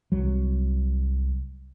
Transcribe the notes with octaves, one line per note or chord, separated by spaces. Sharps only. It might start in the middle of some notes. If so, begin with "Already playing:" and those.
C2 F#3